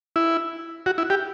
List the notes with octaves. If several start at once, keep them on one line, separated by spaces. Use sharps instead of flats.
E4
F#4
E4
G4